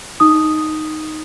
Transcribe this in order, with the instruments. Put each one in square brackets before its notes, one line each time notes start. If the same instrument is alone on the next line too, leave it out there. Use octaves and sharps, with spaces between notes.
[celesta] D#4 D#6